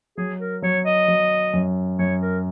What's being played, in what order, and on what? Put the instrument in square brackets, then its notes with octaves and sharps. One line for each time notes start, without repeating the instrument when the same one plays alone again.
[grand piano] F#3 [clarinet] G#4
[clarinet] A#4
[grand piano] F#3 [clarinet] C#5
[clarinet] D#5
[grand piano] F#3
F#2
[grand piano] F#2 [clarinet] C#5
[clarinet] A#4